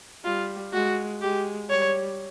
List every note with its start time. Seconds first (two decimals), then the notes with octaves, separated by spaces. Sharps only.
0.25 G3 F4
0.73 G#3 F#4
1.22 G#3 G4
1.70 G3 C#5